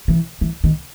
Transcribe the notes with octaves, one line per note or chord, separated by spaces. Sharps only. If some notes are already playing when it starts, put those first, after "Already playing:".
E3
E3
D#3